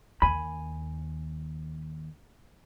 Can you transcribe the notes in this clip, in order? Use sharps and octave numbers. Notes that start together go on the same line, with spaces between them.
D#2 G#5 B5